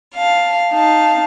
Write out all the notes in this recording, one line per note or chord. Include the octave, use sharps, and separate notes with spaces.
F5 A5
D#4 F5 A5